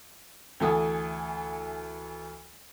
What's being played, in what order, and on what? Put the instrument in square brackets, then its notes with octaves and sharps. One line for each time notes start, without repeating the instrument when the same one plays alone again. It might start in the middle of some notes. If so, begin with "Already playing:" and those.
[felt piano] D2 E3 A4 G#5 D#6